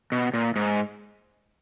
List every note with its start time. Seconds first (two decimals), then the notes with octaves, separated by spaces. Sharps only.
0.12 B2
0.34 A#2
0.56 G#2